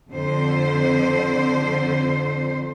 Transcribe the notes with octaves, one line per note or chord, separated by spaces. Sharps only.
F2 D3 C5